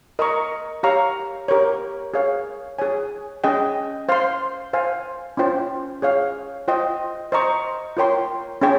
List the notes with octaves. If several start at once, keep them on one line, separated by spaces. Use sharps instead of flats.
A#4 D#5 A#5 C#6
G4 C#5 F5 A#5 C#6
G4 A#4 C#5
G#4 C#5 F5
G#4 C#5 G#5
C#4 G#4 D#5 G5
C5 F5 C6
C5 F5 G#5
C#4 F4 C5 G5
G#4 C#5 F5
F4 C5 D#5 G5
C5 D#5 A#5 C#6
F4 A#4 C#5 G5 C6
C#4 G#4 C#5 G5 C6